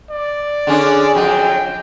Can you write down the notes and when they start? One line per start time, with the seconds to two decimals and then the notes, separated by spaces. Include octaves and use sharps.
0.10 D5
0.67 D3 C#4 D4 G#4
1.15 F2 F#3 G5